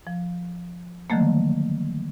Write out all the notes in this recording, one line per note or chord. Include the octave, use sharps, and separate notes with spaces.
F3
D3 D#3 F3 F#3 A3 A#3